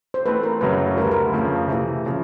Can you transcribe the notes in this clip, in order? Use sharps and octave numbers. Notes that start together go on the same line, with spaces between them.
C5
E3 A3 C4 B4
A#4
F#2 C#3 F#3 A3 B4
D2 D3 G3 A#4
B4
A#4
F2 C#3 F3 A3
C3 E3 A3
C#3 F3